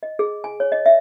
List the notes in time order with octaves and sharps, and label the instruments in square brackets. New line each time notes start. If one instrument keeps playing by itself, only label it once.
[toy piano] D#5
G#4
G#5
C#5
D#5
E5